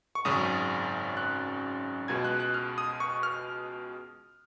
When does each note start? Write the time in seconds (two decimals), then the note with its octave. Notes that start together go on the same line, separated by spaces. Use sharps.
0.15 C#6
0.25 G#1 F#2 C#3 D#6
1.17 F#6
2.08 C#2 B2 G#3 G#6
2.25 F#6
2.40 F#6
2.54 F6
2.78 D#6
3.00 C#6
3.23 F6